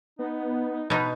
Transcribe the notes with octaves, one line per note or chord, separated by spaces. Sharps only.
B3 D#4
B2 D#4 B4